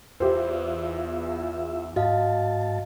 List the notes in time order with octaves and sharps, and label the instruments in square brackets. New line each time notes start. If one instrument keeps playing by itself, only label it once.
[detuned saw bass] E2 [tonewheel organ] F4 E5 [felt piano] G4 C5
[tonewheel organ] G#2 A5 [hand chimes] F#4 D#5 F5